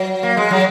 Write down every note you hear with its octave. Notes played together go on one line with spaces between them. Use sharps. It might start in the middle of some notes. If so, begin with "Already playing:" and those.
Already playing: F#3
A#3
G#3
F#3